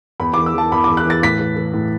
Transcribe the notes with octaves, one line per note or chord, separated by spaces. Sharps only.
E2 B5
E3 D6
E6
E3 A5
E2 B5
E2 D6
F#6
E3 A6
A2 B6
E3
E3
A2